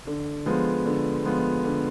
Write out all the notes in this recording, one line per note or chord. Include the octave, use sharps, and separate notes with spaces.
D3
F3 G#3 B3
D3
F3 G#3 B3
D3